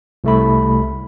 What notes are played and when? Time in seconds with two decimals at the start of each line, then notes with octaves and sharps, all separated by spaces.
0.24 C2 A3 B5